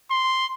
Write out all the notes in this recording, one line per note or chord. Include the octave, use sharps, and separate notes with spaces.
C6